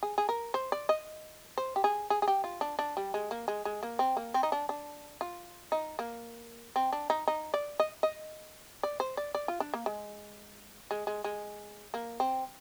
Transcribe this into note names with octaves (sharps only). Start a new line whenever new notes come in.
G#4
G#4
A#4
C5
D5
D#5
C5
G4
G#4
G#4
G#4
G4
F4
D4
D4
G3
G#3
A#3
G#3
G#3
A#3
C4
A#3
C4
D#4
D4
D4
F4
D#4
A#3
C4
D4
D#4
D#4
D5
D#5
D#5
D5
C5
D5
D5
F4
D4
A#3
G#3
G#3
G#3
G#3
A#3
C4